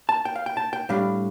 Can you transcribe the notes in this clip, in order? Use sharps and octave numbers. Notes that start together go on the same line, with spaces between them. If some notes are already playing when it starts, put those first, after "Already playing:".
A5
G5
F5
G5
A5
G5
A2 G3 D4 F5